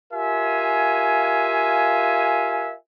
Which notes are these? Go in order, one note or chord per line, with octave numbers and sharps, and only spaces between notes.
F4 G4 A#4 E5 F5 G#5